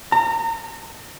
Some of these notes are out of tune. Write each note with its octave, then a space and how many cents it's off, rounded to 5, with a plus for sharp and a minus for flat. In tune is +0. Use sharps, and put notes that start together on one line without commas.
A#5 -35